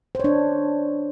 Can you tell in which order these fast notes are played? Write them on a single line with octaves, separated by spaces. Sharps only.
C5 C#5 D4